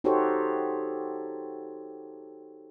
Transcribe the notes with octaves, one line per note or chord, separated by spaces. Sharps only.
D#4 F#4 G4 A4 C5 C#5